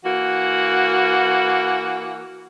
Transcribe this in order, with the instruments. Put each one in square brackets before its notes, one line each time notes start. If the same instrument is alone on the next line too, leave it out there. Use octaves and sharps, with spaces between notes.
[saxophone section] E3 A#3 F#4